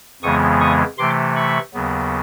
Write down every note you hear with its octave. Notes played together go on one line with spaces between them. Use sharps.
F2 C#3 E3 G#3 B3 C#6 D#6
C#6 D#6
C3 E3 A3 C6 D6
B5 C#6
D#2 C#3 F#3 B3